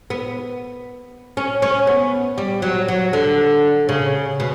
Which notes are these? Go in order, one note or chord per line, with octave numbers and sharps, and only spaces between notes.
B3
C#4
C#4
B3
G3
F#3
F#3
D3
C#3
B2